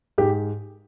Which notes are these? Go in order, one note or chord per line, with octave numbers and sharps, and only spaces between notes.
G#2 G4